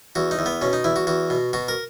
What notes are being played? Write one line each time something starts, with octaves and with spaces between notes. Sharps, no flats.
E2 F#4
D#4
E2
B3
B2 C#4
D#4
E2 E4
F#4
E2 F#4
B2
B2 F#4
A#4